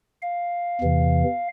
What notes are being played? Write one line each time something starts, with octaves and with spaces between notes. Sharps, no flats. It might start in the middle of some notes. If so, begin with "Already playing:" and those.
F5
E2 C3 E3